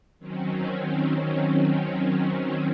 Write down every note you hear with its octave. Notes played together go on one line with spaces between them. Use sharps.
D#3 F#3 C4 C#4